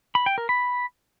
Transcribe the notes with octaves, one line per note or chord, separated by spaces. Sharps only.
B5
G5
A#4
B5